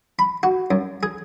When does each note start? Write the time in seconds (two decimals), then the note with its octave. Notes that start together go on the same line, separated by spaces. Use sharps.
0.19 B5
0.43 F#4
0.71 F#2
1.03 G#4